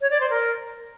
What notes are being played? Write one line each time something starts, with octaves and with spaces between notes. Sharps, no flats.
C#5
D5
C5
A#4